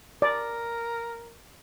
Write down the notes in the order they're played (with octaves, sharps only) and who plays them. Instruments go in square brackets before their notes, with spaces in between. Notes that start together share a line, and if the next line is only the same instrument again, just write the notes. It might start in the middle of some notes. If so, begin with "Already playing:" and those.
[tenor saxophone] A#4 [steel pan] D5